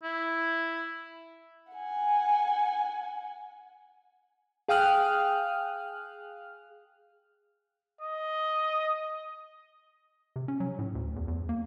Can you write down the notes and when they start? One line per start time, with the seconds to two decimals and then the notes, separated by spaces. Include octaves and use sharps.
0.03 E4
1.72 F#5 G#5
4.68 G#4 F5 G5 D#6 F6 F#6
8.01 D#5
10.36 C3
10.48 C#4
10.60 F#3
10.79 A2
10.95 D2
11.16 E2
11.28 E2
11.49 A#3